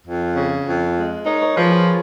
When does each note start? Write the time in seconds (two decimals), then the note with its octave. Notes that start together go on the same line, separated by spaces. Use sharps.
0.07 F2
0.36 C#3
0.66 F2
0.97 G#3
1.26 D#4 A#4 C#5
1.42 A#4 C#5
1.56 F3 G#4 B4
1.71 F4 G#4